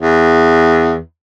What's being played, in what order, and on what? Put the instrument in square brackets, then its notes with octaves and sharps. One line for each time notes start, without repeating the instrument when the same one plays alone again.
[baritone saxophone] E2